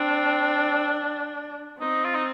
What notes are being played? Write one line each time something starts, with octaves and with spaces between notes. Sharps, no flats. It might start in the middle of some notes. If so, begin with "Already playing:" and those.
Already playing: C4 D4
C4 D#4
F4
D#4